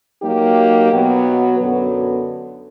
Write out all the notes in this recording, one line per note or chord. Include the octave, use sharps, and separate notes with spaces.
F#3 A#3 D#4 G4
B2 F#3 B3
F#2 D3 F#3 B3